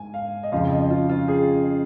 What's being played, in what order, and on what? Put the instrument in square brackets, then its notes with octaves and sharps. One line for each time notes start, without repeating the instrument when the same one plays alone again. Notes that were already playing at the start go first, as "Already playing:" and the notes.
Already playing: [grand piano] G#2 [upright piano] G#5
[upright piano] F5
D#5
[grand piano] F2 C#3 F3 [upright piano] F5
[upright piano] D#5
F4
F4
G#4